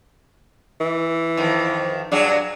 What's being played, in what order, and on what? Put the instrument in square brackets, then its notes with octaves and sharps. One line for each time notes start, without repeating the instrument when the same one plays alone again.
[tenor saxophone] E3
[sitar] F2 D#3
[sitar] G2 F#3 G#4 [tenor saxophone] D4